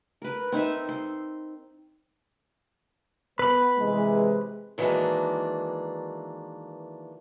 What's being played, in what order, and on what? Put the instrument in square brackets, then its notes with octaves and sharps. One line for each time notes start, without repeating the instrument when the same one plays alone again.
[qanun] A#4 B4
C4 D#4 D#5 E5
C6
[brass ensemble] B3 [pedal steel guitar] B4 B5
[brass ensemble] C3 E3 G#3
[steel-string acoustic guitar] D#3 E3 F#3 G#3 A#3 D4